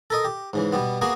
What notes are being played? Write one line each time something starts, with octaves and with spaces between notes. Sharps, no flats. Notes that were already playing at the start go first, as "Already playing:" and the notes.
A4 A#4 D#5
G4
G#2 C#3 E3
B2 G3 B3
A#3 B3 F#4 G#4 B4